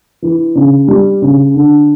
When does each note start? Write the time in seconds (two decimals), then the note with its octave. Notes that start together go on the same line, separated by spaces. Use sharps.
0.22 E3
0.55 C#3
0.88 G3
1.22 C#3
1.54 D3